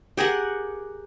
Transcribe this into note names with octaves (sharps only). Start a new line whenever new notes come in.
G4 G#4 A#4 F#5